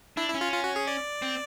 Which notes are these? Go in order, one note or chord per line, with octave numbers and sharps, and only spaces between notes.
D4 E4
E4
C#4
F4
F4
F#4
G#4
D5
C4